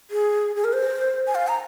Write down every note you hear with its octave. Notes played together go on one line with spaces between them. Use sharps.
G#4
G#4
A#4
C5
G#5
F5
A#5